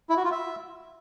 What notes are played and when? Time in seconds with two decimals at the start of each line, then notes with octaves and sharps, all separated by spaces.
0.09 E4
0.17 F#4
0.24 F4
0.32 E5